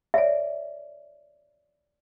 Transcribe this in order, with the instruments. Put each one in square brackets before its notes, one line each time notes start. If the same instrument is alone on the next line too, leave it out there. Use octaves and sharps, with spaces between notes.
[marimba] C#5 D5 [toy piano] E5